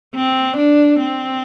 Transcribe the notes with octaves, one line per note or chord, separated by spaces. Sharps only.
C4
D4
C4